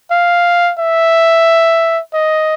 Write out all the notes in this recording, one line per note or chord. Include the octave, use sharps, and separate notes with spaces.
F5
E5
D#5